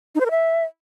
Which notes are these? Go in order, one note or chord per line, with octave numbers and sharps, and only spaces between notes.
D#4
C5
A#4
E5